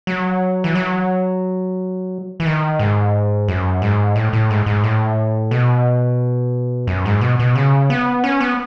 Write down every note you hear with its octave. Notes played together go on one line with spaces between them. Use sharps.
F#3
E3
F#3
E3
D#3
G#2
F#2
G#2
A2
A2
G#2
G#2
A2
B2
F#2
G#2
B2
B2
C#3
B3
C#4
B3